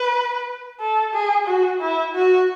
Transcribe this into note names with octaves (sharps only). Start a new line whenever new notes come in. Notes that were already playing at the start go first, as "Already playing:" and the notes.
Already playing: B4
A4
G#4
F#4
E4
F#4